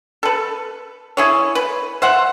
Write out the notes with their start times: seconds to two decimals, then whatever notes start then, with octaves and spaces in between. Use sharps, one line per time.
0.23 A4 B4
1.17 E4 G#4 C#5
1.55 B4
2.02 C5 E5 F#5